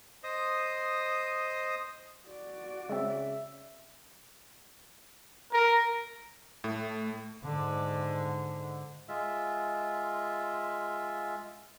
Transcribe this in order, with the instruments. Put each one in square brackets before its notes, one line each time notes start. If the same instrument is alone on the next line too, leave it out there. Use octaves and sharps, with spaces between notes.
[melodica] C5 D#5 D#6
[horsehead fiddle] F#4 D5
[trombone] C#3 [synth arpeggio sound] G#3 C4 [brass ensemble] E5
[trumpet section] A#4
[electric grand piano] A2 [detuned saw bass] A3
[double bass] G#2 D3
[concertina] G#3 F4 E5